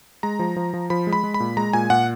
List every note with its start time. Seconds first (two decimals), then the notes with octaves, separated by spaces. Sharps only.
0.23 G#3 A#5
0.39 F3
0.56 F3
0.74 F3
0.90 F3 B5
1.07 G#3
1.13 B5
1.24 G#3
1.34 B5
1.40 A#2
1.57 G#3 A#5
1.73 A#2 G#5
1.90 A#2 F#5